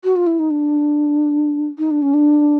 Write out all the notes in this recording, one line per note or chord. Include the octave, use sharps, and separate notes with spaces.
F#4
F4
E4
D#4
D4
D#4
D4
C#4
D4